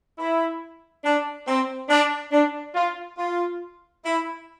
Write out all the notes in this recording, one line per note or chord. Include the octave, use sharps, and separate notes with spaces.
E4
D4
C4
D4
D4
F4
F4
E4